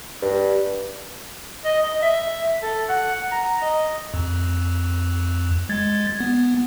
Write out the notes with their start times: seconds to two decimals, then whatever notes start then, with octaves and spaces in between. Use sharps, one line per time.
0.23 G2
1.65 D#5
1.83 D#5
2.02 E5
2.62 A4
2.89 F#5
3.32 A#5
3.62 D#5
4.14 F2
5.69 G#3 G#6 A6
6.20 B3